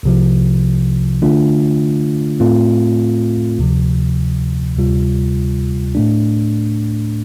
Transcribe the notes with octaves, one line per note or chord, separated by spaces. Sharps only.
C2 C3 F3
D3 A3 D4 F4
A2 A3 C4 F4
D2 C3 F3
D2 C3 G3 F4
A2 A3 D4